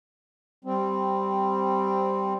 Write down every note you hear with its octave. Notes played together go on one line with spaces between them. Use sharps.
G3 C4